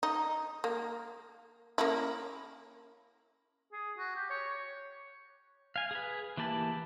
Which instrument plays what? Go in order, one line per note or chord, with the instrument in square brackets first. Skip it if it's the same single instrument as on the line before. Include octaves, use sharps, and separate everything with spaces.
[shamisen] D#4
A#3
A#3 C#4 E4
[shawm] G#4
F#4
G4
C#5
[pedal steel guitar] F5 G#5
G#4 B4
E3 A#3 G4 A5 B5